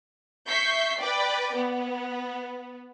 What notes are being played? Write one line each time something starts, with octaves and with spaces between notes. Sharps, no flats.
E5 C#6 G6 B6 C7
B4 D5 G5
B3